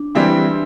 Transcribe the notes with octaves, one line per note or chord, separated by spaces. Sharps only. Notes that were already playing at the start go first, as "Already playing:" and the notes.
Already playing: D4
E3 G3 C4 E4